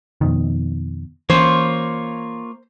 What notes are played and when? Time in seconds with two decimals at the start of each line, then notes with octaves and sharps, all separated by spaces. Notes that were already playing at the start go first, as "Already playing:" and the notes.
0.21 F2 B2 D#3
1.30 E3 A#3 C#4 F4 C5 C#5